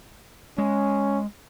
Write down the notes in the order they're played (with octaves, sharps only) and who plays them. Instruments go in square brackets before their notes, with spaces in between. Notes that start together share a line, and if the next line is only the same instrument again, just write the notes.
[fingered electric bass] G#3 [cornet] C#4